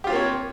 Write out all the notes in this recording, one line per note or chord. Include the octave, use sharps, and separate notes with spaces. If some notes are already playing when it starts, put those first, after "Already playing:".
A#3 C4 F4 G4 C#5